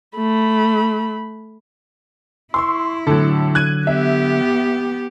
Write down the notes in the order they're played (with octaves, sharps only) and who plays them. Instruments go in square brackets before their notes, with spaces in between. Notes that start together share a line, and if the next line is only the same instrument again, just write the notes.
[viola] A3 B5
[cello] E4 [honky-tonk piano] C6 C#6 E6
[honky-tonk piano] A2 A4 [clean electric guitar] D3 F#3
[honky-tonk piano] F#6 G#6 D#7
[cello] B3 G4 [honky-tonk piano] E5